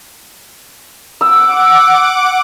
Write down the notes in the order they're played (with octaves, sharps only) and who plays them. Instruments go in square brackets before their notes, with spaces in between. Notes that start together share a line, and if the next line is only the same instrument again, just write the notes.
[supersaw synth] F#5 D6 [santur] E6